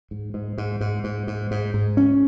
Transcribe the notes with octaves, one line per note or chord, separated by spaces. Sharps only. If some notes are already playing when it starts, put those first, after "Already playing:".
G#2
G#2
G#2
G#2
G#2
G#2
G#2
G#2
C#4